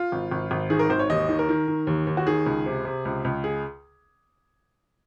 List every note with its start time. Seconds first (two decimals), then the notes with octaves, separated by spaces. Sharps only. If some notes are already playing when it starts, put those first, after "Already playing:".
Already playing: F4
0.12 G#1
0.31 G#1
0.51 G#1
0.70 D#3 G#4
0.79 A#4
0.90 G#1 C5
0.99 C#5
1.10 D#2 D#5
1.29 D#3
1.39 A#4
1.49 D#3
1.68 D#3
1.87 D#2
2.07 D#2
2.17 F#4
2.27 D#3 G#4
2.46 C#2
2.66 C3
2.85 C3
3.05 C#2
3.25 C#2
3.44 G#4